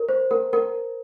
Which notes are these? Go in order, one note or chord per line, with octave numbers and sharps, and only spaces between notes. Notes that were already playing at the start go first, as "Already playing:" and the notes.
Already playing: A#4
C5
A#4
A#4